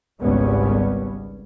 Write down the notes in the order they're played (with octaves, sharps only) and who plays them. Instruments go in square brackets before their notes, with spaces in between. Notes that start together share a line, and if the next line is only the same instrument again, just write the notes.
[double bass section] G#1 C#2 G3 B3 C#4